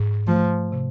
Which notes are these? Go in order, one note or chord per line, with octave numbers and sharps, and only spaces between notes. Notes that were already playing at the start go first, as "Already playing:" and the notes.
Already playing: G#2
F3 A3
C3